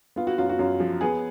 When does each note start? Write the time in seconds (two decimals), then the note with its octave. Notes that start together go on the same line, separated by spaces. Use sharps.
0.16 B3 F4
0.27 F#4
0.38 F#2 F4
0.49 F#4
0.59 F#2 F4
0.80 F3
1.01 B3 G#4